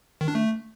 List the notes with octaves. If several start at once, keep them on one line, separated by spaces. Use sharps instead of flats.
D#3
D4
A3